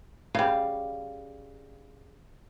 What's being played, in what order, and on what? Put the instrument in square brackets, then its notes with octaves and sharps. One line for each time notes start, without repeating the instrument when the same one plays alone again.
[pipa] C#3 G3 [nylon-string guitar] F5